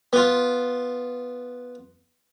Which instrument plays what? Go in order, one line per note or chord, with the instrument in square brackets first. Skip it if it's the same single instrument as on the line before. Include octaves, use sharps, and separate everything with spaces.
[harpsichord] B3 F4